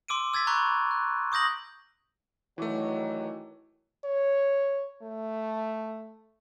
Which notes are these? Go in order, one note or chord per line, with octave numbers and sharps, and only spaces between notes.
C6 D6 E6 D7 D#7
E6 G#6 A6 B6
A#5 B5 C#6 F#6 B6
F#6
C#6 D#6 G6 A#6 F#7
G2 D#3 E3 F#3 A3 E4 C#6 D6
C#5
A3